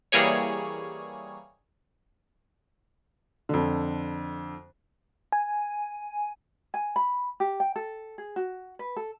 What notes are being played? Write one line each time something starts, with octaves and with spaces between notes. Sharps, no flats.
E3 G3 A#3 G#4 C#5
F2 D3
G#5
G#5
B5
G4
G5
A4
G#4
F#4
B4
A4